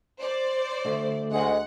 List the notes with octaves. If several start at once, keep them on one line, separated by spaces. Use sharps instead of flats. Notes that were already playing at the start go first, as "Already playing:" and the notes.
C5 D5
D3 A3
D2 G#3 F#5